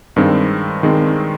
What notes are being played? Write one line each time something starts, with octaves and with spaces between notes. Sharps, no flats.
G2 D#3 G#3 C4
D#3 G#3 C4